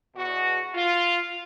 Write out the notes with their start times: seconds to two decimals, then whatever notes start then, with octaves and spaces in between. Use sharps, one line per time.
0.15 E2 B2 F#4
0.74 F4